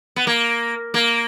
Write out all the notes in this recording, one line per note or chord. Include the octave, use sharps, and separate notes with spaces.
B3
A#3
A#3